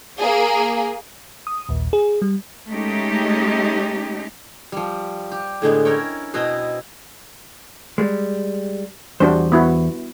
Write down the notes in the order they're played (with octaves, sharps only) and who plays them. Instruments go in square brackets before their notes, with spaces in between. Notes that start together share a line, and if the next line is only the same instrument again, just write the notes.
[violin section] A#3 G#4
[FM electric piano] D#6
A#1 D#2 A#2
G#4
G3
[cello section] G#3 A3 C#4 D#4 G4
[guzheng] F3 G3
G4
A2 D3 G#3 B3
C#4 E4 A#4 C#5 G5
B2 C4 E4 B4 D#5 C6
[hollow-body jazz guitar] G3 G#3
[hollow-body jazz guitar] E2 C5 [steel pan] G3 D4 F#4
[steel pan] B3 E4 F#4